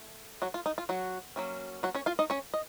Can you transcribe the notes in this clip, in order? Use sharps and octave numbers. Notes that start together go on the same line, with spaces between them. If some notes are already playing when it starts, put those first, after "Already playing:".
Already playing: A3
F#3 F#4
F4
D#4
F4
F#3 F#4
F#3 A#3 C#4
F#3 F#4
C#4 C#5
F4 F5
D#4 D#5
C#4 C#5
D#5